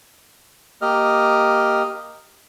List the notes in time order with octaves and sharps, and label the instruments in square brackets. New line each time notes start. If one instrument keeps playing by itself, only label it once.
[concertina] A#3 G4 D#5 F6